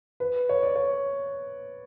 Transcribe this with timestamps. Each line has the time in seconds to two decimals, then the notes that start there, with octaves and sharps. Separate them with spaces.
0.20 B4
0.49 C#5
0.63 D5
0.76 C#5